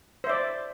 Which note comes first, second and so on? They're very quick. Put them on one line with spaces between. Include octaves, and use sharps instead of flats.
C5 E5 D5